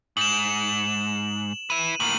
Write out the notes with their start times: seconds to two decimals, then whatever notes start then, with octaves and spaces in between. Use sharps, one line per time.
0.17 G#2 E7 F#7
1.70 E4 B4 D#7
2.00 A2 A#3 F#7